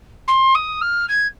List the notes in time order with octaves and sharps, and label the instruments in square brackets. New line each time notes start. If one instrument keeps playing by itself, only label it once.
[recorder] C6
D#6
F6
G#6